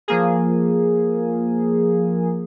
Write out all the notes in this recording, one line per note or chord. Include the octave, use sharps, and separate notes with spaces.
F3 A#3 G#4